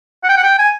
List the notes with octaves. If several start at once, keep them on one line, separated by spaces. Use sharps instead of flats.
F#5
G5
F#5
G5
G#5